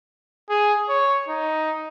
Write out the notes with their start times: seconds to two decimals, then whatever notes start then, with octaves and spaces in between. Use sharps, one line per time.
0.50 G#4
0.89 C#5
1.29 D#4